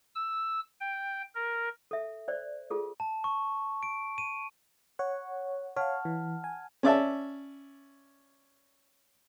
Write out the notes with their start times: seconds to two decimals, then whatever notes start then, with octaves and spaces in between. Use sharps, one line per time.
0.15 E6
0.81 G5
1.35 A#4
1.91 A4 E5
2.28 C5 D5
2.70 F4 G#4 A4
3.00 A5
3.24 C#6
3.83 D7
4.18 D#7
4.99 C#5 F#5
5.76 C#5 F5 F#5 A5 F6
6.05 E3
6.44 G#5
6.83 C#4 D5 E5 A5